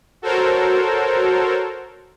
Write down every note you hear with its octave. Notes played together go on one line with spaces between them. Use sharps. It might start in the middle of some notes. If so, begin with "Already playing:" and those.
F#4 A4 A#4 C5 C#5